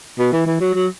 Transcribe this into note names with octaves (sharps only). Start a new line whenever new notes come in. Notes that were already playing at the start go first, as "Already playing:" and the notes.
B2
E3
E3
F#3
F#3